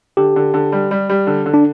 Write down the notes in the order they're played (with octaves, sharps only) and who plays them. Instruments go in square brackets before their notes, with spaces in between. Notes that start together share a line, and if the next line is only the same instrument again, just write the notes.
[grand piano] D3 [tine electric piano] G4
[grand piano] D3
D3
G3
G3
G3
D3
D3
[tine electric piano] D4